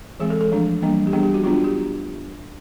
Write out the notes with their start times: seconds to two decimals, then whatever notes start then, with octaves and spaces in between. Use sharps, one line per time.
0.20 E3 G#3 C4 G#4
0.30 A4
0.41 A4
0.52 F3 A3 D4
0.82 E3 G3 A#3 D4
1.07 G4
1.13 G3 B3 D4 G#4
1.23 G4
1.34 F#4
1.44 F#3 B3 D4 F4
1.54 F#4
1.64 G4